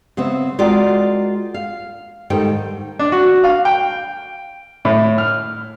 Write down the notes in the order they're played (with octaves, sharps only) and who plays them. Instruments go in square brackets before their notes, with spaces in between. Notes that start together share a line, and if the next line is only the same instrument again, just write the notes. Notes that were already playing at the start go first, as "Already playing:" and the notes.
[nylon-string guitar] C#3 B3 C4 E5
G#3 F4 F#4 A#4 D5 G5
F5
G#2 D#3 G3 A4 G5
[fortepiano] D4
F#4
F5
G5
A2
F6